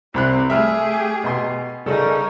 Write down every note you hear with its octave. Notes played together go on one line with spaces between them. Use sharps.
C2 C4 G4 B5 F#6
A3 G4 G#4 E5 F6
B2 C6
C#3 G3 C#4 D#4 A4 A#4